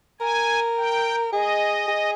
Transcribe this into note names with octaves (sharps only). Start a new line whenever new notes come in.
A#4 G#5
G5
G#4 D#5
G#4